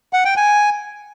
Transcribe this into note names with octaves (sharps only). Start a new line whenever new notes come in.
F#5
G5
G#5